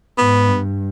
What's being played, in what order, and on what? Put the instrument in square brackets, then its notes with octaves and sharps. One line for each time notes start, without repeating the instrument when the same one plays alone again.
[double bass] G#2 [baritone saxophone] B3
[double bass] G2